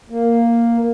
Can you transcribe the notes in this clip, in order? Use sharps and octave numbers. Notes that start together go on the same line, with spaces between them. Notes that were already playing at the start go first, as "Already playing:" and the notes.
A#3